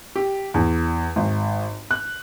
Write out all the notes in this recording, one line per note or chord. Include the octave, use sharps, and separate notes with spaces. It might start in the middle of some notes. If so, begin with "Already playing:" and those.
G4
E2
G#1
F#6